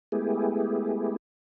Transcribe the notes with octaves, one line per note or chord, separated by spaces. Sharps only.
G#3 A3 B3 E4 G4 G#4